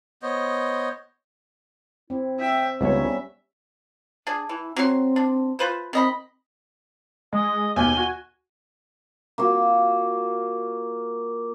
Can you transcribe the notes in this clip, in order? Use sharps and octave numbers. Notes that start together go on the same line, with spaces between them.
B3 C5 C#5 D#5
C4 E4
E5 G5
C#2 G3 B3 C#4 D#4 C#5 E5
D4 G#4
E3 E4
F#3 C4 C6
D4
F4 B4 C5
D#3 C4 D#5 B5
G#3 D#5
D#2 B2 G#5 G7
F#4
A#3 F4 F#4